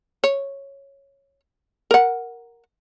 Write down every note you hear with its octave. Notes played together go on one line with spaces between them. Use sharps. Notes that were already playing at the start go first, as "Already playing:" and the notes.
C#5
A#4 F#5